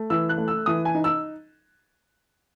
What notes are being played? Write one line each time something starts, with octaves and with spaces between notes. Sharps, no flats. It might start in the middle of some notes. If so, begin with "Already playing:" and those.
Already playing: A3
E3 E6
F#6
A3
E6
E3 D#6
G#5
D#4
E6